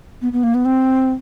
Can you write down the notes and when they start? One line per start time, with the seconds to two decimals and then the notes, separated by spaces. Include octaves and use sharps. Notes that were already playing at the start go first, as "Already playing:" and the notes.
0.22 B3
0.32 B3
0.43 A#3
0.54 B3
0.65 C4